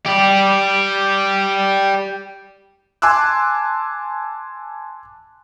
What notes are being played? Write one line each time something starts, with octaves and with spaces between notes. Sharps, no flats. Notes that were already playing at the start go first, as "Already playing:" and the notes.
G4 D5
G#5 A5 C6 D6 E6 F#6